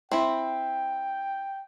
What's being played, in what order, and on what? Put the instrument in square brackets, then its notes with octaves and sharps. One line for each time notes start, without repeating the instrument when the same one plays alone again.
[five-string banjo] C4 E4 [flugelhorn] G5